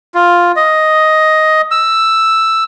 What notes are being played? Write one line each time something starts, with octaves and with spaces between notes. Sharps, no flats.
F4
D#5
E6